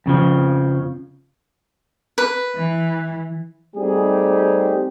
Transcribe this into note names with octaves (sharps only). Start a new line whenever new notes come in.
F2 C#3 F3
B4
E3
G3 A3 C4 D#4 G4 G#4